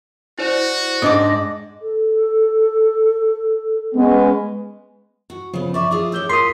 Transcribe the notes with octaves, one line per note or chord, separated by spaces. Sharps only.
E4 F#4 C5 D5
G#2 D4 D5 D#5 D#6
A4
G#3 B3 C#4
F#4
C#3 F3 B3
D5 E5 C#6 D6
E4 F4 G#4 D6
E4 G4 C#5 E6 G6 G7
F4 A#4 C6 D#6 B6 C7